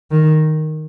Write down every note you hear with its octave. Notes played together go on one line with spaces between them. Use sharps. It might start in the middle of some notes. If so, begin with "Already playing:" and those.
D#3